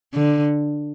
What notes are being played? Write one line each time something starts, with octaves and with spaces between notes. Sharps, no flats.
D3